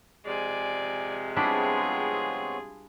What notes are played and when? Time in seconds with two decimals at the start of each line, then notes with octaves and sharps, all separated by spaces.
0.25 C3 F3 G#3 D5 G#5
1.36 G3 B3 C4 D4 E4 F4 G#4 C#5